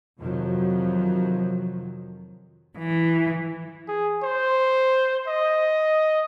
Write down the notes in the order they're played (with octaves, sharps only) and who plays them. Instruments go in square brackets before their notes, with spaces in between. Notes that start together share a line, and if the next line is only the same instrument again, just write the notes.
[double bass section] F2 C3 D#3 F3 F#3
[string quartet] E3
[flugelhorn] G#4
C5
D#5